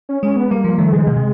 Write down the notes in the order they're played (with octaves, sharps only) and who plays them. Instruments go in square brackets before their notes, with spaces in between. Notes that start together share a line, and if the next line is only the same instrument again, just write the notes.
[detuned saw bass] C#4
[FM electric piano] G#3 [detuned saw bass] C#4
[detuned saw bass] B3
[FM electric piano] G3 [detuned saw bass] A#3
[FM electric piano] F3
[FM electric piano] D#3 [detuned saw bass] A3
[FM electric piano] C#3 [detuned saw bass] G#3
[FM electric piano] B2
C3